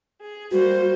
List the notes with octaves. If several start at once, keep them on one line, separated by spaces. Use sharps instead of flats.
G#4
G3 A#3 F#4 C5